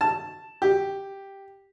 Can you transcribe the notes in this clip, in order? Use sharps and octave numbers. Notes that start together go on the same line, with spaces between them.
A5
G4